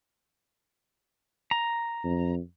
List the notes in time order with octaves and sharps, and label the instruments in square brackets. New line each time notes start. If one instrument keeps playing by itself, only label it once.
[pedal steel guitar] A#5
[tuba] F2